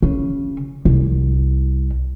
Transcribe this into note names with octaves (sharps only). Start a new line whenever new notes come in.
C#3
C2